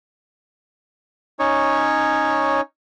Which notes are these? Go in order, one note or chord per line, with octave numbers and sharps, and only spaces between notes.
C#4 D#4 C#5